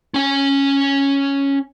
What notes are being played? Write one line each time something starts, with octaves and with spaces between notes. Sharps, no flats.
C#4 G#5